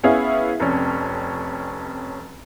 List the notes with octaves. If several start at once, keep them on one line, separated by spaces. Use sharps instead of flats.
B3 C#4 E4 G#4 F5
F1 F2 C#4